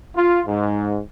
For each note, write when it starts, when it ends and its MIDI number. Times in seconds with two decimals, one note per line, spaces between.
0.16 0.42 65
0.47 0.98 44